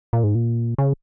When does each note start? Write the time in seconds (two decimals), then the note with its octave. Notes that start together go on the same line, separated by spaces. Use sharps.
0.13 A#2
0.23 G#2
0.35 A#2
0.78 C#3